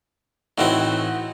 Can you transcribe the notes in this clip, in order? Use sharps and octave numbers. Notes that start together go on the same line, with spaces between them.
A2 E3 C4 D#4 E4 F#4